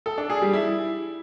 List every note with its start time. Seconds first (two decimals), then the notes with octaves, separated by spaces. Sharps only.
0.06 A4
0.18 D4
0.30 G#4
0.41 G3
0.53 E4